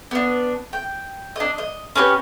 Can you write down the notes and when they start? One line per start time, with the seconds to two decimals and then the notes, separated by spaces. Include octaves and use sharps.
0.11 B3 D4
0.73 G5
1.36 D4 D#5
1.58 D#5
1.96 C#4 F#4 G4 B4